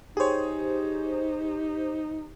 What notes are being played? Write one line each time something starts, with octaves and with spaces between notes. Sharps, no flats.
D#4 G4 G#4 C5 C#5